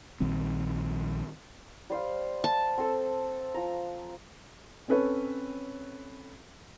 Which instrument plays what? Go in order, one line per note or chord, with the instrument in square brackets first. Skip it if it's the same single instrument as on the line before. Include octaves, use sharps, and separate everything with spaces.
[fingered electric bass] A#1 D#3 G3 C4
[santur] G3 C5 F5
[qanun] A5
[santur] C4 A4
F3 A#5
[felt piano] C4 C#4 A4 B4 C#5